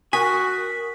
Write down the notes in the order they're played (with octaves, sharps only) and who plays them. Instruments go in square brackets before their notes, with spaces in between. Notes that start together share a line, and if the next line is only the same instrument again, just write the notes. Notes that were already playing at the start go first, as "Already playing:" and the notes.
[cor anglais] F#4 [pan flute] A#4 [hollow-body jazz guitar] G#5 [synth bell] D#6 F#6 B6